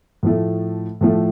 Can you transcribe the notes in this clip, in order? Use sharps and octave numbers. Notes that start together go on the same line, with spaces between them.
A2 F3 A3
A2 F3 A3